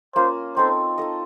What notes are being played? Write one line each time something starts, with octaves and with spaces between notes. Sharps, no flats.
A#3 C#4 F4 C5
C4 D#4 A4 C5
D#4 A4 D#5